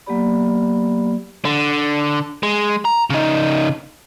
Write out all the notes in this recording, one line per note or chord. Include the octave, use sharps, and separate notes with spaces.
F#3 A#3 B3 G4 D5 B5
D3
G#3
A#5
C#3 D#4